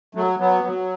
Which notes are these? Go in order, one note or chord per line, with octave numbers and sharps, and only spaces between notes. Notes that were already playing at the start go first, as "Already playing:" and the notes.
F#3 A3
F#3 B3
F#3